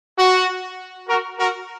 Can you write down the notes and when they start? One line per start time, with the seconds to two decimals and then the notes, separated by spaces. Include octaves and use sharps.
0.18 F#4
1.08 F#4 A#4
1.38 F#4 A#4